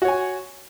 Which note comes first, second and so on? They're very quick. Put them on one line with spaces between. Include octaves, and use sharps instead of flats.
F#4 C#5 G#5